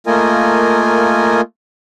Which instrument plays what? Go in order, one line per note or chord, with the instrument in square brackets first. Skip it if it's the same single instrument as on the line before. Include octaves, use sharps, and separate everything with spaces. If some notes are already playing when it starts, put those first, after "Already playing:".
[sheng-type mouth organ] A3 A#3 F4 A#4 D#5 G#5